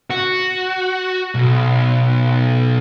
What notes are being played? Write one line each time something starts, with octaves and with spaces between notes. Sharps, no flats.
F#4
B1